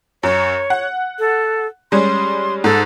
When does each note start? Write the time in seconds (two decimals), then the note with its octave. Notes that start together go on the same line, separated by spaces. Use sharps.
0.23 F#2 C#5
0.70 F#5
1.19 A4
1.92 G3 G#3 C#4 C6
2.64 G#2 A4